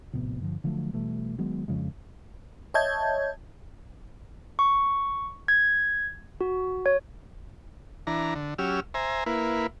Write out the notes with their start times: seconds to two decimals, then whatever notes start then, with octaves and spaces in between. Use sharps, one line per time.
0.13 A#1 A2 C3 B3
0.40 G2 D3 F3
0.64 D3 F3 F#3 A3
0.93 B2 E3 G3 A3
1.38 D#3 F#3 G#3 B3
1.68 F2 C#3 F3 G#3
2.74 C#5 D#5 E5 A5 G6 G#6
4.59 C#6
5.48 G#6
6.41 F#4
6.86 C#5
8.07 E3 D4 A#5
8.35 D3
8.59 F#3 C#4 G4 E6 F6
8.94 C5 E5 G#5 A#5
9.26 A#3 E4 B4